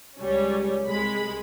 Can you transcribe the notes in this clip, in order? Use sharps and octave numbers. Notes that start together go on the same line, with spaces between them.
C#2 G3 C#4
C2 G#3 B5